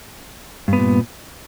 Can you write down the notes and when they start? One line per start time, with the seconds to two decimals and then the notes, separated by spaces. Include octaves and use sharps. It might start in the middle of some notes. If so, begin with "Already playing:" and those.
0.68 G2
0.73 B3
0.78 A#2